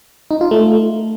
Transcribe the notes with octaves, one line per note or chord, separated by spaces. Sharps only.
D#4
F4
A3